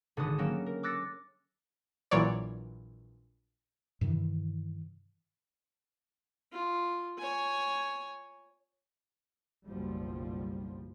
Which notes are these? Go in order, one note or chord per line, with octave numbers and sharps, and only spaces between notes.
G#1 D3 G#3 B4 A5 D#6
F#3 A#3 C#4 G5 E7
A#4
D6 E6 F#6 A6 A#6 C#7
A#1 A#2 E3 F#3 C#5 D5
G2 C3 D#3 E3
F4
C#5 G#5
F#1 B1 F3 G3